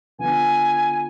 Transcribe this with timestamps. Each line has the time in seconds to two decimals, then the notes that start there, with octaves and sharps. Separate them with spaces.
0.18 D3 F3 B3 G#5